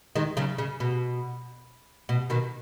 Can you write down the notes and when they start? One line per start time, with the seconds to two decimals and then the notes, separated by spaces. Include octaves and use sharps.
0.15 D#3 G#3
0.37 C#3 F#3
0.58 C#3
0.80 B2
2.09 B2
2.30 B2 D#3